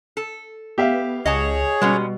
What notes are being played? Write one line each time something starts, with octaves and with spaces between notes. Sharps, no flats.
A4
B3 G4 E5 F5
C#2 G#4 C#5 D#5 F#5 A5
B2 G3 G#3 B3 C#4